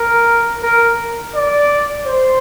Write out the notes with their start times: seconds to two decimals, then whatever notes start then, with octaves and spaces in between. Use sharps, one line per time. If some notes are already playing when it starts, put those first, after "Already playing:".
Already playing: A#4
0.63 A#4
1.35 D5
2.06 C5